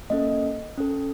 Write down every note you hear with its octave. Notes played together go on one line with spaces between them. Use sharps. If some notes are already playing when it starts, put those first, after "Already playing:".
A#3 C#4 A4 D#5
C#4 A4